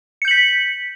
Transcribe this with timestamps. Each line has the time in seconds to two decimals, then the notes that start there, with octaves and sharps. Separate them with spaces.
0.22 C#7
0.25 G6
0.28 F#7
0.31 B6